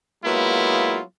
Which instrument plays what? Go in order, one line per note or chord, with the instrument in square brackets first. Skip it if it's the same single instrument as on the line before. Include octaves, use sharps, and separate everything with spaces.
[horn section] F#3 G#3 A#3 B3 E4 F4